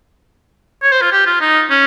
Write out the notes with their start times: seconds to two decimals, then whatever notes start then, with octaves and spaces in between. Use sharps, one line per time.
0.82 C#5
0.92 C5
1.01 F4
1.12 G4
1.26 F4
1.41 D#4
1.70 C#4